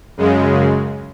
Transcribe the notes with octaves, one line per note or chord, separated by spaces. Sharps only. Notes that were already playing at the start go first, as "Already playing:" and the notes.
F#2 C#3 G#3